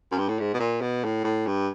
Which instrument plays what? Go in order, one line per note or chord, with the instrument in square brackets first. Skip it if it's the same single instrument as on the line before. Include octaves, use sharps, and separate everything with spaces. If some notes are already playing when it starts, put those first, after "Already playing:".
[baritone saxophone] F#2
G2
A2
G#2
B2
A#2
B2
A2
A2
G2